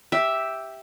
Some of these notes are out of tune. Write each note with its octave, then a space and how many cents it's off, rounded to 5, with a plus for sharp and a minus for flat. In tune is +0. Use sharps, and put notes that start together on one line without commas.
G4 +0 E5 +0